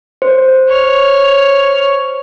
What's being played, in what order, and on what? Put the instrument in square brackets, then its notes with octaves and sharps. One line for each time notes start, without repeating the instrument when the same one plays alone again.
[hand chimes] C5
[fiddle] C#5 F6